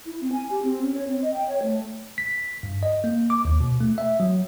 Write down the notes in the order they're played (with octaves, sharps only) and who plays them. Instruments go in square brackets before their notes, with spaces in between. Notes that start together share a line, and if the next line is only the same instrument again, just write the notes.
[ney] E4
C4
G#5
G4
C4
C#4
C#5
C4
D#5
G5
C#5
A3
[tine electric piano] B6
G2
D#5
A#3
D6
D#2
B2
A3
E5
F#3